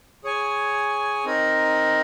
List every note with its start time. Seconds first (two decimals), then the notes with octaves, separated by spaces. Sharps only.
0.24 G#4 C#5 G#5
1.25 C4 D#4 A#4